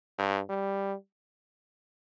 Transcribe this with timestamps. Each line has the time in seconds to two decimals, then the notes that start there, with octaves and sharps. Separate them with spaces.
0.18 G2
0.49 G3